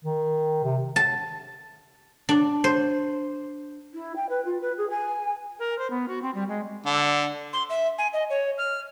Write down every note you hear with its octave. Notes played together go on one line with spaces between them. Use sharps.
D#3
C3
A5
D4
C5
E4
G5
B4
F4
B4
G#4
G#5
A#4
C5
B3
F#4
C4
G3
G#3
D3
C6
E5
G#5
D#5
C#5
F6